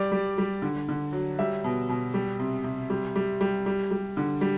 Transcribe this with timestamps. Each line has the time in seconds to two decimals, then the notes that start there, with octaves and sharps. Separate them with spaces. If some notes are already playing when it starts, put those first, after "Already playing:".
Already playing: G3 D5
0.12 G3
0.38 G3
0.62 D3
0.89 D3
1.13 F#3
1.39 G3 E5
1.64 B2
1.89 B2
2.14 G3
2.40 C3
2.64 C3
2.90 G3
3.16 G3
3.41 G3
3.66 G3
3.91 G3
4.17 D3
4.41 G3